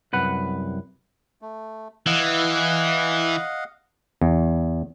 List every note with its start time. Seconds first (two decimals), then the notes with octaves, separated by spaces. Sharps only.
0.13 C2 F#2 B4 F#5
1.42 A3
2.06 E3 D#5 F5 F#5
4.22 E2